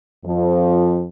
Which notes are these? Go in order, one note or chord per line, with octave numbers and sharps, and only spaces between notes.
F2 F3